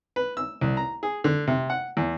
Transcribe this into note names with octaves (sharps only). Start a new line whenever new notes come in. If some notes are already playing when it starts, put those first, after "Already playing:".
B4
E6
C2
A#5
G#4
D3
C3
F#5
E2